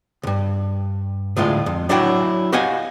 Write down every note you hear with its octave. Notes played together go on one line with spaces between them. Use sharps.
C#2 G2
D2 A2 G#3 F4
F2
F#3 D4 E4 F#4 C#5 G5
F#4 G4 D#5 F5 F#5 G#5